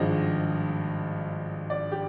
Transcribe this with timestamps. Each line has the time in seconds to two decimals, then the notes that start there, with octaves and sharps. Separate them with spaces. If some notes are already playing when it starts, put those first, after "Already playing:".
Already playing: G#1 G2 F3 G#3 D#5
1.70 D5
1.92 G4